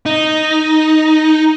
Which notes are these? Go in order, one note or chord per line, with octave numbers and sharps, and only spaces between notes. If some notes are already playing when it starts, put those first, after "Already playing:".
D#4